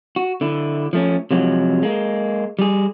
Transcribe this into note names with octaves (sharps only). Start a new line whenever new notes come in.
F#4
D3 E4
F3 A3 C#4
C3 F3 F#3 G#3
G#3 A#3
G3 G#4